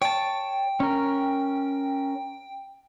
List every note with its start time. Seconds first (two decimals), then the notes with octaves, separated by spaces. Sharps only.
0.02 C#5 G5 A5
0.80 C#4 A#4